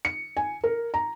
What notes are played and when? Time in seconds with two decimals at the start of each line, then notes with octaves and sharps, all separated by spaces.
0.05 C#7
0.37 G#5
0.64 A#4
0.94 A#5